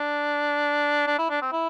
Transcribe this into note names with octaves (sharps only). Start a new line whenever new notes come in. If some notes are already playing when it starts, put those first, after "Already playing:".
Already playing: D4
D4
E4
D4
C4
E4